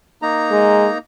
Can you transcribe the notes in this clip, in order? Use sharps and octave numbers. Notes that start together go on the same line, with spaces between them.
A#3 D#4 A#5
G#3